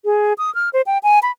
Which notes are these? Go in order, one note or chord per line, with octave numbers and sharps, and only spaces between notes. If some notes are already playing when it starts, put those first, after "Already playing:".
G#4
D#6
F6
C5
G5
G#5
B5